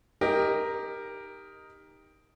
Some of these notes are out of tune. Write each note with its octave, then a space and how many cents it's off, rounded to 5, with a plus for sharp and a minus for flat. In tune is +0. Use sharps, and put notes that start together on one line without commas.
D#4 +0 G4 +15 A#4 +0